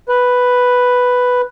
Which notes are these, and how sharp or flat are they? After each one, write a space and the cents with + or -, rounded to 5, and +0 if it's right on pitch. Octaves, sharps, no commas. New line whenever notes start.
B4 +5